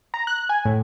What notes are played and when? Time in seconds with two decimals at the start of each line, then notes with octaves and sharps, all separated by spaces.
0.14 A#5
0.27 F#6
0.49 G#5
0.65 A2